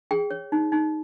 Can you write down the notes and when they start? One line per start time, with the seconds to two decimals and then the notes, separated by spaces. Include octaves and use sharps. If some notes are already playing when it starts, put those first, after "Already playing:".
0.11 G#4 G5
0.31 C#5
0.52 D#4
0.72 D#4